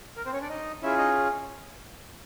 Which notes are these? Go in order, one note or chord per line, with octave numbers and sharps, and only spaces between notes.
A#4
C4 C5
C#4 C#5
D4 D5
D#4 D#5
C#4 E4 F4 G#4 E5
D#4 D#5